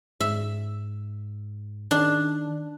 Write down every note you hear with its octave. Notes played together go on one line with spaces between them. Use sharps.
G#2 E5
D#3 D4